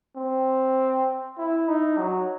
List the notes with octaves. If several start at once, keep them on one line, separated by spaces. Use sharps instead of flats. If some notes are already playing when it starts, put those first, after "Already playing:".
C4
E4
D#4
F#3